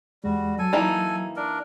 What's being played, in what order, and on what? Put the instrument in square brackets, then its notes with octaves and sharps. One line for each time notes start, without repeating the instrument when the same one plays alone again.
[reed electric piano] E2 G#3 [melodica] G3 F#4
[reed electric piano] F#3 [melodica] A4 G#5
[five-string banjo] E3 A#3 D#4
[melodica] D4 A#4